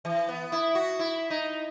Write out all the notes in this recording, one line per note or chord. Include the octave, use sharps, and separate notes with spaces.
E3
B3
E4
F#4
E4
D#4